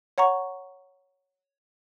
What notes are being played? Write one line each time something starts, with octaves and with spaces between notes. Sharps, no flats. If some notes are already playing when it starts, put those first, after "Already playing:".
C#5 F#5 A#5 C#6